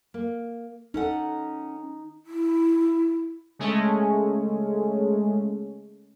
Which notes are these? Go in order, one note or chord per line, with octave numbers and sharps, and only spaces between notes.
A#3
C#4 D#4 A4 F#5
E4
C#3 G#3 A3 C#4